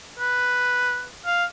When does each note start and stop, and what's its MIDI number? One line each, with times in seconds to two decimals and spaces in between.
0.19 1.05 71
1.26 1.45 77